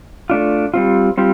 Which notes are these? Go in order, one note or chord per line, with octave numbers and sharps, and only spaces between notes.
A3 D4 F4
G3 C4 F4
G3 C4 F4